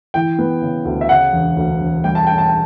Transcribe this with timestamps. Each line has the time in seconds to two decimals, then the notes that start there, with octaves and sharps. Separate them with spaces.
0.14 E3 G5
0.39 B3
0.62 C#3
0.85 D2
1.01 E5
1.09 C#3 F#5
1.33 E1
1.57 D2
1.81 E1
2.04 G3 G5
2.15 A5
2.27 C#4 G5
2.38 A5
2.49 G5